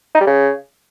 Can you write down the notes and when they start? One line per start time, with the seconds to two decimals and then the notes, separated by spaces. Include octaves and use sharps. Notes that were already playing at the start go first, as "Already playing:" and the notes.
0.15 D#4
0.21 G3
0.27 C#3